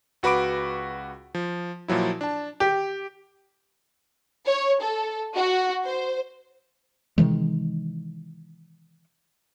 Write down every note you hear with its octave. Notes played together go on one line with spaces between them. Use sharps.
C#2 F#4 B4 B5 D6 D7
F3
A#2 F3 F#3 E4
D4 A5
G4
C#5
A4
F#4
C5
C3 D#3 E3 G#3